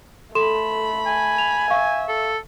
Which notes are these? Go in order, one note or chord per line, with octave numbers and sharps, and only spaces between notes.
A3 A4 B5 C6 E7
G#5
F7
E5 F5 C#6
A4